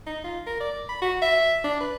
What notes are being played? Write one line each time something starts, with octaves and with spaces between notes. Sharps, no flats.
D#4
F4
A#4
D5
B5
F#4
E5
D4
B4